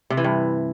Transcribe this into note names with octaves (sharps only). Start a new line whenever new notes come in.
C3
E3
G2